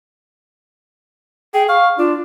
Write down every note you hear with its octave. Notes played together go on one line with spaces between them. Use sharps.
G#4 G5
F5 C#6
D4 F4